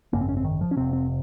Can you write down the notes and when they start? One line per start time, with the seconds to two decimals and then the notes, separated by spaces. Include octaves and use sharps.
0.13 G#1 F#2 C#3 A#3
0.21 C4
0.29 C#4
0.37 C4
0.45 D#3
0.61 F3
0.71 C#4
0.77 F1 F2 C3 C4
0.93 C4